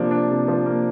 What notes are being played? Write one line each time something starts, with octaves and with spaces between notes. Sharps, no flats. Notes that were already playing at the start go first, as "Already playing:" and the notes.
Already playing: C3 F3 A#3 D4
D4
C3
F3
A#3